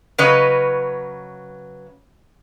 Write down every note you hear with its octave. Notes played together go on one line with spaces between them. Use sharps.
C#3 F#3 B4 C#5 D#5